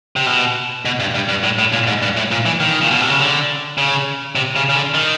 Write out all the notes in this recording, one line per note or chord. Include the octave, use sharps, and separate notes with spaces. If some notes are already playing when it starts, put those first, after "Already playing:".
C3
B2
B2
G2
G2
G2
A2
A2
A#2
G#2
G2
A2
A#2
E3
D#3
A#2
B2
C3
C#3
D3
C#3
C3
C#3
C#3
D3
D#3